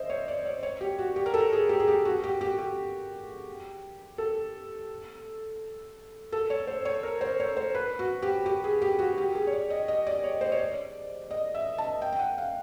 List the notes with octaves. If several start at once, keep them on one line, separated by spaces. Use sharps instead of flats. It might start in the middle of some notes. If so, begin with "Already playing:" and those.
Already playing: C5 D#5 E5
C#5
D5
C#5
C#5
G4
F#4
G4
A#4
A4
G#4
G4
G#4
G4
F#4
G4
G4
G4
A4
A4
C#5
C5
C#5
A#4
C5
C#5
C5
B4
F#4
G4
G4
G#4
G4
F#4
G4
G#4
C#5
D5
D#5
D#5
D5
C#5
C5
C#5
D5
D#5
E5
A5
G5
G5
F#5
F5